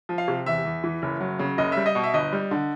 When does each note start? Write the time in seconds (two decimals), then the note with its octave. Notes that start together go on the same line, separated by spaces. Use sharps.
0.09 F3
0.18 F5
0.28 C3
0.46 E2 E5
0.65 E2
0.84 E3
1.02 F#1
1.20 F#3
1.39 C#3
1.58 F#1 D#5
1.72 G3 E5
1.86 D#5
1.95 B2
2.03 E5
2.14 G1 D#5
2.32 G3
2.51 D3